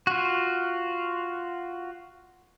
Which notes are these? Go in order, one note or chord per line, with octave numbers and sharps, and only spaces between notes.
F4 F#4